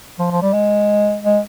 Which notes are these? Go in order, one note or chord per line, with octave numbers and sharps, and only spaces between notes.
F3
F3
G3
G#3
G#3